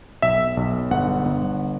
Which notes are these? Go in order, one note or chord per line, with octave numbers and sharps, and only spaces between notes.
B1 E5
B1
G1 F#5
G1